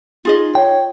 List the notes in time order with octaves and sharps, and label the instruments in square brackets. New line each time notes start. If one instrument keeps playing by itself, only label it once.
[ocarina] D#4 [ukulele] F4 G#4 D#5
[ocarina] C#5 [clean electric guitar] G5